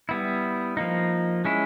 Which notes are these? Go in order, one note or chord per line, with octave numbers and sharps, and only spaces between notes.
G3 B3 E4
F3 A#3 D#4
G#3 C#4 E4